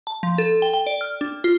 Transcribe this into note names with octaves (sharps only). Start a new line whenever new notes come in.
A5
F3
A4
G5
G5
D5
F6
D4
F4